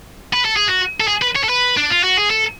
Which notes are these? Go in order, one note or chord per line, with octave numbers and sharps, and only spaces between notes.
B4
A4
G#4
F#4
A4
G#4
B4
C#5
A4
B4
D4
F4
F#4
G#4
A4